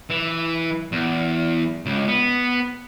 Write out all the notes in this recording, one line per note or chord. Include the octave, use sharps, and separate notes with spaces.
E3
E2
C#2
B3